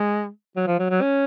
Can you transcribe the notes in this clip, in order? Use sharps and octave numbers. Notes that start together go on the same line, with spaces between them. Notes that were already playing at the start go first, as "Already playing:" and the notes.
Already playing: G#3
F#3
F3
F#3
F#3
C#4